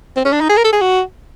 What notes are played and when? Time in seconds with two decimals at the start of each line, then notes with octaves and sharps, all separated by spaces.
0.17 C4
0.25 C#4
0.33 D4
0.41 D#4
0.50 G#4
0.57 A#4
0.65 A4
0.73 G#4
0.81 F#4